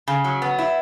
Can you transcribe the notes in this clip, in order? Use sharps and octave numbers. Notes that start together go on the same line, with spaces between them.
C#3
F#3
B3
E4